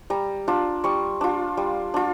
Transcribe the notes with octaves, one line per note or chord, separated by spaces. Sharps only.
G3 A#5
D4 F4
G3 C#6
D4 F4
G3
D4 F4